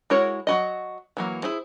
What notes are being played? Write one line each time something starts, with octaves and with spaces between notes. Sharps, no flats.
G#3 E4 F#4 A#4 C#5
F#3 F#4 D#5
E3 F#3 A#3
E4 G#4 C5